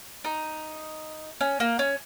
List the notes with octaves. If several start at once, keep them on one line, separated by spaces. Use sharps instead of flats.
D#4
C#4
A#3
C#4